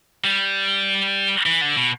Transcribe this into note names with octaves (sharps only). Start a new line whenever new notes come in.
G3
E3
D3
B2